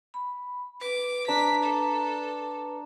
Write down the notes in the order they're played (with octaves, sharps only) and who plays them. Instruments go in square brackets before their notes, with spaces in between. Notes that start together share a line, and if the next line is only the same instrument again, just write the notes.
[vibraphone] B5
[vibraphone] B4 [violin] D6
[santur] D4 A5 A#5 [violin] B6
[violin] A4